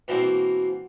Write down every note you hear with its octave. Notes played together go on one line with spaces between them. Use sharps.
B2 E3 A#3 C4